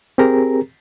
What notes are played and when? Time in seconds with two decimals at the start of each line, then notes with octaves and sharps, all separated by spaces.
0.18 C4 G4 G#4 A#4 A#5